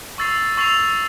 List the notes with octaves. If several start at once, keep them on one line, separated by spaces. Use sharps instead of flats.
C#6 E6 A6 C7 F7
C#6 E6 A6 C7 F7